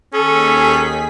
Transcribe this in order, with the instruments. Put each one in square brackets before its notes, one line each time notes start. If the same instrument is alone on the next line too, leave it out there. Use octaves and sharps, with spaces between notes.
[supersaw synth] D#2 G#4 B6 [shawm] C#4 [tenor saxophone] A4